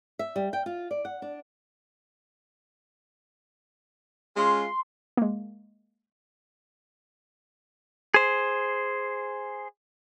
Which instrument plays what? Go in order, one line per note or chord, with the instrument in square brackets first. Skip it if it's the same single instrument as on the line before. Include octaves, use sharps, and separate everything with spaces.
[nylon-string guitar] E5
G3
G5
F4
D5
F#5
D4
[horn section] G#3 C#4 F4 [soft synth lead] C6
[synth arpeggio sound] G#3 A#3
[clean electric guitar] G#4 C5